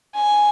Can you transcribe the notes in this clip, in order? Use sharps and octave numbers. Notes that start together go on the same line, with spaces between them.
G#5